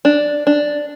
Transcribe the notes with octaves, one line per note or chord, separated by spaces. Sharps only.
D4
D4